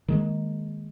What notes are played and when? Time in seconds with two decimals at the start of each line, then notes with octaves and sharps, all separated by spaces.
0.08 D#3 G#3 A#3